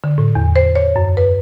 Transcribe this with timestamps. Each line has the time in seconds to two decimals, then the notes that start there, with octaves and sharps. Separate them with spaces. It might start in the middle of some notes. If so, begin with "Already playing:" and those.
0.04 D3
0.18 A2
0.35 E2
0.56 C5
0.76 C#5
0.96 F#2
1.17 B4